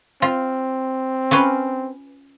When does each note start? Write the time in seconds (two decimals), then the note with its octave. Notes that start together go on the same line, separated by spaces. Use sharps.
0.22 C4 F4
1.31 C#4 F4 B4